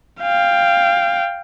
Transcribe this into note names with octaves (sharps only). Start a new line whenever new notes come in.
F5 G5